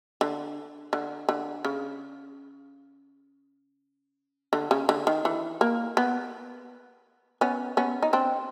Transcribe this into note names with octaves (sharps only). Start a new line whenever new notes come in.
D3
D3
D3
C#3
D3
C#3
D3
D#3
E3
A#3
B3
B3 C#4
B3 C#4
D#4
C4 D4